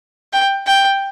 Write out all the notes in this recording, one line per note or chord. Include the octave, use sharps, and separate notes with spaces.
G5
G5